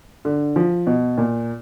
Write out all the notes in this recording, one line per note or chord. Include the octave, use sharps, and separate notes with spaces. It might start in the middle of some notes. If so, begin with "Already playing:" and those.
D3
F3
B2
A#2